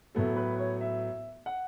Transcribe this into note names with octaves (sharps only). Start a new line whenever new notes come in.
A2 F#3 B3 A4
B4
C#5
E5
F#5